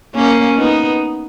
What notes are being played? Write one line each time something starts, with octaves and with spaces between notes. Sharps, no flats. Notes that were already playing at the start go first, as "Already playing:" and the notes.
A#3 C#4
B3 D#4